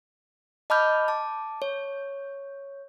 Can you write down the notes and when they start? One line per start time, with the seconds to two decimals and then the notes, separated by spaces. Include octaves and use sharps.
0.70 D#5 A5 B5 D6 F6 G6
1.08 A5 D6
1.62 C#5